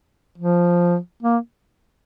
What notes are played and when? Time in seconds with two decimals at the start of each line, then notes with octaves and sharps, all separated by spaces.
0.38 F3
1.22 A#3